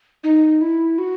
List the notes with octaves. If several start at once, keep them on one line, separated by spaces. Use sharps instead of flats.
D#4
E4
F#4